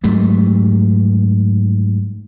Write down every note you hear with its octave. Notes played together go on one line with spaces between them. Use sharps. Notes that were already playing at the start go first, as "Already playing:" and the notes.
G#2 F#3 G3 A3